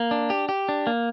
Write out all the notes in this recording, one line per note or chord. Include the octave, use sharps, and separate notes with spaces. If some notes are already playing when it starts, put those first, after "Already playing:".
Already playing: A#3
D4
G4
G4
D4
A#3